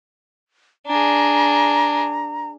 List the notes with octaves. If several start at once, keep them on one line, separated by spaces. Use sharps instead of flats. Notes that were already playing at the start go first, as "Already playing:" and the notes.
D4 G#4 A#5